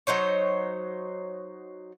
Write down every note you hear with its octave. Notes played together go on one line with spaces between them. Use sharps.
F#3 D#4 C5 C#5